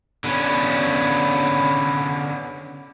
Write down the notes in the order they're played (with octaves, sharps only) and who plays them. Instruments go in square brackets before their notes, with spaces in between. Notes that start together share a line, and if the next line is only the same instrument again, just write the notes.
[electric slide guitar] D3 B3 C#4